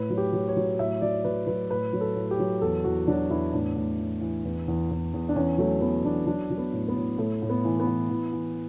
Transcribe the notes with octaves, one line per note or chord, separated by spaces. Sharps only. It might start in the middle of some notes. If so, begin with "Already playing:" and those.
Already playing: A2 B4
F#3
G4
F#3
C#5
F#3
A2 E5
F#3 D5
F#3 B4
F#3 B4
A2 B4
F#3
A4
A2
G4
F#3
E2 A4
E2 F#4
F#3 D4
E2 E4
A2 D4
A2
E3
E3
E2
E2
E2
E2
D4
E2 C#4
F#3 A3
E2 B3
E2 D4
F#3 D4
F#3
B3
A2
B3
A2
A2 A3
A2
B3
E3
B3
E3
E3
E3